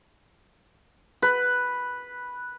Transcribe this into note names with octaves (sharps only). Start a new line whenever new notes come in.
B4